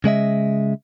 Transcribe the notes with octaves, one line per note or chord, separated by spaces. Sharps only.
C#3 G#3 D#5 E5